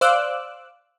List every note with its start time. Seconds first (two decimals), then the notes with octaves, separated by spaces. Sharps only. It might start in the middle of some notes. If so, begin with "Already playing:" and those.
0.01 C5 D5 F5 D6 E6 F#6